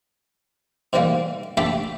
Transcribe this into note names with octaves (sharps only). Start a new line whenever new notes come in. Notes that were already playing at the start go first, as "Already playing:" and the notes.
G#2 B2 E3 G3 A#3
A#1 A3 G4 A4 G5 B5